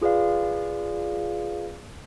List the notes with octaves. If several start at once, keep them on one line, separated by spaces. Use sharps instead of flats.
F4 G#4 B4 D5 F5